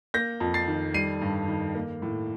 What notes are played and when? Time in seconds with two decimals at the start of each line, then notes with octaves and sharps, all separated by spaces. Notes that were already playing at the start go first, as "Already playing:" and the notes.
0.14 A#3 G6 A#6
0.40 F2
0.54 A6 C7
0.68 D#3
0.94 G3 C7 D#7
1.21 G2
1.48 D#3
1.75 A#3
2.02 A2